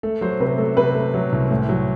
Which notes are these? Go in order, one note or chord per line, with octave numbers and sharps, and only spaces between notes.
A3 A4
F#3 C5
C3 B4
A3 A4
C3 B4
A3
F#3
C2
A2
F#3